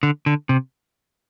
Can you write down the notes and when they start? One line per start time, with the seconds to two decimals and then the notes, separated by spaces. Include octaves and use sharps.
0.03 D3
0.26 D3
0.49 C3